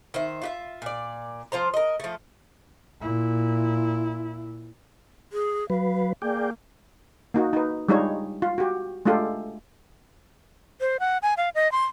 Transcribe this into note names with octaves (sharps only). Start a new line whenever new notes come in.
D#3 C5 E5
F4 F#4 E5
A#2 D5
F3 F4 C5 A#5
A#4 D#5
F3 A3
A#2 E4
G#4
F#3 B4 F5
A#3 G#4 D5 G5
A#3 D#4 F#4
D#4 B4
G3 G#3 D4 D#4 F4 C#5
F4
F#4 G4
G#3 A3 D4 F4 G4 A4
C5
F#5
G#5
F5
D#5
C6